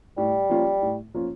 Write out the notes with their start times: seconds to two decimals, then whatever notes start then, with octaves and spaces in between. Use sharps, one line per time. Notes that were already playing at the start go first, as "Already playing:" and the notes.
0.18 A2 G3
0.50 F3 A#3 C#4 F4
0.82 A2
1.14 F3 A#3 C#4 F4